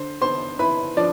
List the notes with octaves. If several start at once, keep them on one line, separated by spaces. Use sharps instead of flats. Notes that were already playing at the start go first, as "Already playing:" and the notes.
Already playing: D3 C5 C6
B3 C5 C6
E4 B4 B5
F3 D4 D5